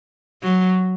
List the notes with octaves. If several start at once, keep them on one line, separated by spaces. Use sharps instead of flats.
F#3